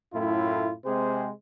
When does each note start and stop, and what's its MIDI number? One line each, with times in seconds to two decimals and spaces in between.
0.14 0.73 42
0.14 0.73 45
0.14 0.73 57
0.14 0.73 64
0.14 0.73 65
0.85 1.30 48
0.85 1.30 56
0.85 1.30 60
0.85 1.30 68
0.85 1.30 72